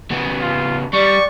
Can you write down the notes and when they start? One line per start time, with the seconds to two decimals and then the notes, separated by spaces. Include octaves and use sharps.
0.11 C#3 B3
0.42 F4
0.94 G3 D5 C#6